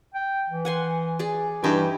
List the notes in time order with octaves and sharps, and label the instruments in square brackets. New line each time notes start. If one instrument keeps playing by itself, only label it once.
[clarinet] G5
E3
[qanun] F#5 G#5 C6
G#4 D5
[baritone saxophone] G2 [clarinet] E3 [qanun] D#4 E4 G4